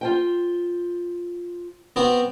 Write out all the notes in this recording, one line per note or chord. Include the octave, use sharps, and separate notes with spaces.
F4 C5 G5
B3 C4 F#4